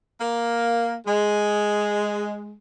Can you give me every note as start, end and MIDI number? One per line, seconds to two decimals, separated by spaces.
0.20 0.95 58
1.06 2.56 56